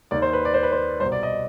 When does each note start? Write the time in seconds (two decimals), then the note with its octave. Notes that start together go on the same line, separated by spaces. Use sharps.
0.11 D#2 D#3 D5
0.22 C5
0.33 B4
0.45 D5
0.54 C5
0.63 B4
0.72 C5
1.00 C2 B2 C5
1.12 D5
1.23 D#5